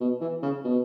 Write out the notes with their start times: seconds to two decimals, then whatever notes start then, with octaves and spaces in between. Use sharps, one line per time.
0.01 B2
0.21 E3
0.43 C#3
0.64 B2